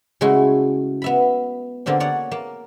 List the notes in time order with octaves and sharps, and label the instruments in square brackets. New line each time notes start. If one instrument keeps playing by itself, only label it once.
[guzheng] C#3 G#3 A3 E4 F#4
B3 E5 B5
D3 A#3 C4 D4
C#5 D5 F#5
A#3